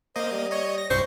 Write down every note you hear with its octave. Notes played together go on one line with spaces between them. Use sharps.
A#3 C5 D#5
G3
C#5 D#5
A#6
C2 G2 C5 C#6